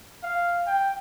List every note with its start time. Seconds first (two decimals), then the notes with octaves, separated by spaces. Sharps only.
0.23 F5
0.66 G5